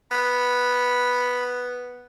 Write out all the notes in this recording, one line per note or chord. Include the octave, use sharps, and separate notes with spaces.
B3 B5